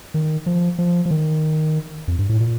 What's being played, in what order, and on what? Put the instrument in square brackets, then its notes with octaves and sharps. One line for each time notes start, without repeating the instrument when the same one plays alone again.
[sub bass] D#3
F3
F3
F3
D#3
F2
G2
A2
A#2